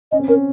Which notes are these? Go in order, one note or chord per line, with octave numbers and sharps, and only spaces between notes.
C#4 D#5
C4
C#4 A#4